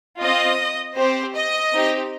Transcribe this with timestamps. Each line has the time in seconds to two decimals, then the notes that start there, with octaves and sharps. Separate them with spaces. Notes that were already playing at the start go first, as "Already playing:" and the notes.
0.21 C4 F4 D#5
0.97 C4 G4 C5
1.35 D#5
1.72 C4 D#4 G4